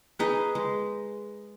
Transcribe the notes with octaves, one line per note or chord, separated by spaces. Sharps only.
D#4 G#4 B4
G#3